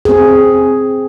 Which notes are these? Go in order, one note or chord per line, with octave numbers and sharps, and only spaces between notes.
C4 G#4